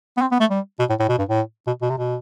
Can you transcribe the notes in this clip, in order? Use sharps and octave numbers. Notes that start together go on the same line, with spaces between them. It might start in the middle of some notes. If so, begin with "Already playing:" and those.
B3
C4
B3
A3
G3
B2
A2
A2
B2
G2
A2
B2
B2
C3
B2